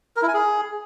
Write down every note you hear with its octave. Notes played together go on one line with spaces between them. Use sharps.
A#4
E4
G#5
G#4